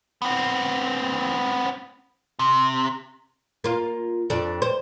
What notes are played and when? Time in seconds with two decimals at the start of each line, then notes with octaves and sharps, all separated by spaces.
0.22 B3 C4
2.39 C3
3.64 A#3 F4
4.30 F2 D4
4.62 C5